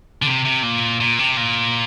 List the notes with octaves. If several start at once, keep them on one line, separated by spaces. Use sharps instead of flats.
D3
C3
C3
A#2
A#2
C3
A#2